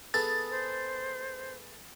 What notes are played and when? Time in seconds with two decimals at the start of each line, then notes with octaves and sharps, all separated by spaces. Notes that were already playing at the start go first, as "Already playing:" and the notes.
0.14 B3 G#4 A4 A6
0.50 C5